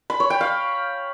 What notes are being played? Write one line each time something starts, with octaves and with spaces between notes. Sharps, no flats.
B5
C#5
G5
F5